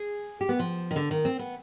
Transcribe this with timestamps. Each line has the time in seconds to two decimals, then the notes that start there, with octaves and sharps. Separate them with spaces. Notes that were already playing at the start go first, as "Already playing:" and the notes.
Already playing: G#4
0.41 G4
0.49 B3
0.59 F3
0.91 D#3
0.96 D3
1.11 D#3
1.25 C4
1.39 B3